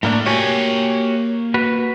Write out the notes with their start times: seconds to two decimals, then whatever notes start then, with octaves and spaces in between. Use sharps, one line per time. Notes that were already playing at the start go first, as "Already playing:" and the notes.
0.03 A2 A3 A#3 D4
0.26 A#3 F#4 G4 C#5 G#5
1.54 F#4 B4